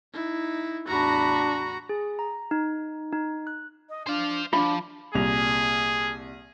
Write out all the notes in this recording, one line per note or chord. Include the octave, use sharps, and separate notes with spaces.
D#4 E4
E2 A2 D4 F#4 A#5 B5
G#4
A#5
D#4
D#4
F#6
D#5
D4 C5 F5
F3 D4 F4
C2 A#2 G#4 F7